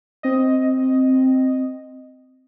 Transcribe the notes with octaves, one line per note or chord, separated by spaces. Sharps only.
C4 D#5